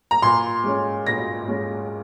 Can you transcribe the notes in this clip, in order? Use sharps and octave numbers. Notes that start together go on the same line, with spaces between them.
A#5
A#2 C6
G#3 C#4
A#2 A#6
G#3 C#4